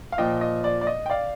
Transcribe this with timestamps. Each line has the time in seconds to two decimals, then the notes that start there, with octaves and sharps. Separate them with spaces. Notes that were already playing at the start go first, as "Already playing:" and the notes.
0.12 F5
0.18 A#2 F3 D#5 G5
0.41 D#5
0.64 D5
0.81 D5
0.87 D#5
1.06 G5
1.10 D5 F5